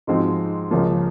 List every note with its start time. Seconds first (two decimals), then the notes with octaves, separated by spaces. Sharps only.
0.07 G#2 F3 G#3 C4 F#4
0.71 C#2 C#3 F3 A#3